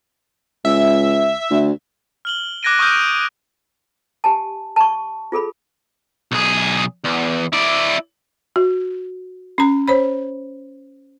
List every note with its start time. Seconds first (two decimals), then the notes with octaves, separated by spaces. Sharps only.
0.65 C#2 E5
1.51 D2
2.25 F6 F#7 G7
2.63 D6 F#6 G#6 A#6 D7 D#7
2.79 C#6 D#6 F6 G6 D#7
2.92 D7
4.24 G4 G#5 A5
4.76 A5 C#6
5.32 F4 G#4 A4 B5
6.32 B1 G#4
7.04 E2
7.53 E4 D5
8.56 F#4
9.58 C#4 A#5
9.88 C5 C#5 B5